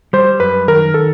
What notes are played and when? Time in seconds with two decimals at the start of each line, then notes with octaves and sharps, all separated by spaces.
0.13 G3 C5
0.40 F#2 B4
0.68 D#3 A#4
0.94 A4